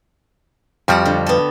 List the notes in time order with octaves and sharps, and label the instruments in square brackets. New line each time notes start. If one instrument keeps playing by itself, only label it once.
[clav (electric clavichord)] F2 F3 G3 [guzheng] F#4 G4 F#5
[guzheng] D3
B3 A4